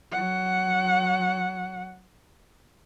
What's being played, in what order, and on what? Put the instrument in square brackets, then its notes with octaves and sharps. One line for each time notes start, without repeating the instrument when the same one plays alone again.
[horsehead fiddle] F#3 F#5